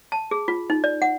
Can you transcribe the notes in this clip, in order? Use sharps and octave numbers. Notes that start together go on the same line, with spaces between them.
A5
G#4
F4
D#4
D5
F#5